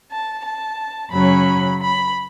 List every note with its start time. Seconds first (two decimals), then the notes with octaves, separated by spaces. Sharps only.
0.10 A5
0.43 A5
1.11 F#2 C#3 F#3 C#4 B5
1.80 B5